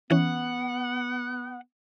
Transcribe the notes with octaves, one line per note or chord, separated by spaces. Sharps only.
E3 B3 C#4 F#5